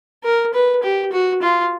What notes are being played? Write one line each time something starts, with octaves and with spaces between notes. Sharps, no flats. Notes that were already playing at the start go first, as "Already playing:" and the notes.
A#4
B4
G4
F#4
F4